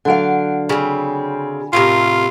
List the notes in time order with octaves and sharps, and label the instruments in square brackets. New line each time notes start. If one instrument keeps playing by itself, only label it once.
[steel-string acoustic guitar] D3 F#3 F5 [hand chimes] F#5 D7
[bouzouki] C#3 C4 [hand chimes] G#5 B5
[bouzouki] A2 C3 A#4 [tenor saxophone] F4